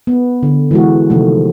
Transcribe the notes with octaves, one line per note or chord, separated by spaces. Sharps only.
B3
D3
E3 G#3 F#4
C3 D#3 F3 A3